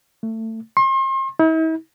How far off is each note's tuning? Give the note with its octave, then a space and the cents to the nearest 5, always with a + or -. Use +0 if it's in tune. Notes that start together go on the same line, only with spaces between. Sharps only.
A3 +25
C6 +40
E4 -45